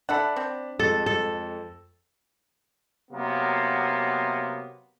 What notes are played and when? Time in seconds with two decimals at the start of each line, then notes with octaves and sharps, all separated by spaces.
0.09 D4 A4 E5 F#5 B5
0.36 C4
0.79 F2 G#3 A4
1.06 A4
3.11 C3 F#3 A#3 B3